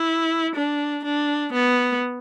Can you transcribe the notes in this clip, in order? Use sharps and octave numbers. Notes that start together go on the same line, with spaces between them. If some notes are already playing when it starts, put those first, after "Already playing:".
Already playing: E4
D4
D4
B3